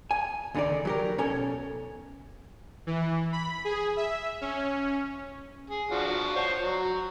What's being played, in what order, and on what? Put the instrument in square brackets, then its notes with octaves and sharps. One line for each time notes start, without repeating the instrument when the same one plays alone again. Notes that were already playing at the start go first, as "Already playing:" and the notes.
[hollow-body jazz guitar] G#5
C#2 D3 D#3 D#4 D5
F#3 G4 A#4
B1 C#4 A4 C#5 G#5
[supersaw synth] E3
B5
G#4
E5
C#4
[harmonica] G#4
F3 D4 F#4
C5 C#5
F#3